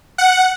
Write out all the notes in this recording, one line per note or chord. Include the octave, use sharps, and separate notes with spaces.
F#5